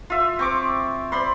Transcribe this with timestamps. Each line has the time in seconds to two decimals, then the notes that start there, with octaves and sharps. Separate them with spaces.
0.10 F4 E5
0.39 C4 C#6 D6
1.12 C5 D5 B5 C6